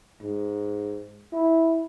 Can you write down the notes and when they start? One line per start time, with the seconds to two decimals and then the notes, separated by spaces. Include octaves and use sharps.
0.22 G#2
1.33 E4